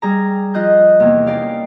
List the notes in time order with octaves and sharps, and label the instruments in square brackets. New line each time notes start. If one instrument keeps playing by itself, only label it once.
[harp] G3 G#4 A#5
F3 F4 D#5 D#6 F#6 G6
E2 C3 A#3
C#4 D#4 G4 D5 F5